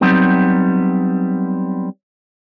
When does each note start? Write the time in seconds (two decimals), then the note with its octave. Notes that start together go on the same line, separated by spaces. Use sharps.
0.01 F#3 G3 B3 C4 D#4